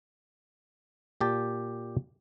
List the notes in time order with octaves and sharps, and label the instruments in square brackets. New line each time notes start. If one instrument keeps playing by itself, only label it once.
[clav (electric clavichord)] A#2 G4 A5